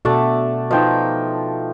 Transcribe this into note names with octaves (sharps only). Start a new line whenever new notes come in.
B2 A3 D4 F#4 D5 E5
F3 D#4 B4 D#5 G5